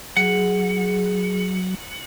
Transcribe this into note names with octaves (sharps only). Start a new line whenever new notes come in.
F#3 G#4 F#5